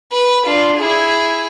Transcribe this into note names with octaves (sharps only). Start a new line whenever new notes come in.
B4
D4 F4
E4 G#4